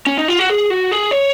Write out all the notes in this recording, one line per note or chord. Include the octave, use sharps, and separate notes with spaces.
C#4
D#4
F4
F#4
G#4
F#4
G#4
C#5